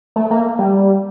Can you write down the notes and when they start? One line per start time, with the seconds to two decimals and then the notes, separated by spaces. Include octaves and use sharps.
0.16 A3
0.31 A#3
0.59 G3